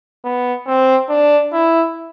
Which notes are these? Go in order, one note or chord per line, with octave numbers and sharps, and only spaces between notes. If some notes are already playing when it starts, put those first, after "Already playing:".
B3
C4
D4
E4